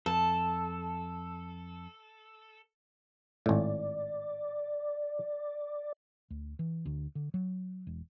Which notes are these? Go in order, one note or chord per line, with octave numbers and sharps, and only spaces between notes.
F2 A4 A5
G#1 A2 D5
D2
E3
D2
D3
F#3
E1